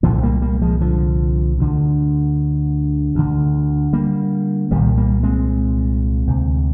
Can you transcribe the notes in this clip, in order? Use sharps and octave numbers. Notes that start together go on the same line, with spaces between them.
C2 A#2 D3 F3
G3 A#3
G3 A#3
F3 G#3
D3 F3
D2 D3
D2 D3
G3 A#3
C2 A#2 D#3 G3
G3 A#3
G#3 C4
D2 C3